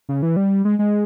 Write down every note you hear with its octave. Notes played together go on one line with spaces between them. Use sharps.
C#3
E3
G3
G#3
G#3